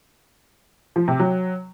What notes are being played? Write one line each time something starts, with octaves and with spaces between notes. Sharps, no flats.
F3
C3
F#3